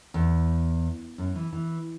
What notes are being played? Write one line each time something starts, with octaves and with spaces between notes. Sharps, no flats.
E2
F#2
E3
E3